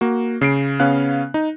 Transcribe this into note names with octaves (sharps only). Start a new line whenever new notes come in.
A#3 F#4
C#3 C7 D7
C#3 B3 C#4 F5 F#6
D#4